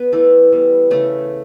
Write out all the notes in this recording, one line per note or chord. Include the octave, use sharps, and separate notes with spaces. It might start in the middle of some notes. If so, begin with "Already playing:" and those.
Already playing: B3 B4
E3 A3 A4
G3 B3
C#3 A3 A4